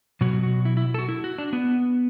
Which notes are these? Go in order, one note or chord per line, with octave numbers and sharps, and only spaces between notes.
B2 F#3 F#4
F#4
E4
E4
A4
F#4
E4
F#4
D4
B3